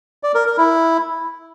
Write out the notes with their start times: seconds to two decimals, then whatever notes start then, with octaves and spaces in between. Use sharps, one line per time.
0.23 D5
0.35 A#4
0.46 A#4
0.58 E4